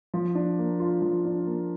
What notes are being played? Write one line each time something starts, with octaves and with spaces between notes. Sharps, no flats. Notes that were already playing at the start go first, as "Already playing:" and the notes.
F3
D4
A#3
F4
F3
D4
A#3